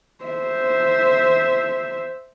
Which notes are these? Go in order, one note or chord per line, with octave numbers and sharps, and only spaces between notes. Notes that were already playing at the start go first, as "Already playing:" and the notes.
C5 E5